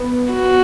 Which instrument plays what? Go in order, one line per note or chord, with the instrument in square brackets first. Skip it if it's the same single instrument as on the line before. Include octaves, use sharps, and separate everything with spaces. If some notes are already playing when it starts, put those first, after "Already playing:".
Already playing: [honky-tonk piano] B3
[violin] F#4